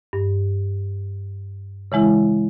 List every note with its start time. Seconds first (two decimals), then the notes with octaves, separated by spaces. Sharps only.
0.13 G2
1.92 C#3 E3 G#3 E4